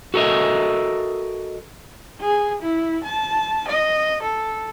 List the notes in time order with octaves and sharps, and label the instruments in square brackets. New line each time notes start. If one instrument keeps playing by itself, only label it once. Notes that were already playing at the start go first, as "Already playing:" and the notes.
[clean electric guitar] F#4 A4 A#4 D#5 E5
[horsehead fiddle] G#4
E4
A5
D#5
A4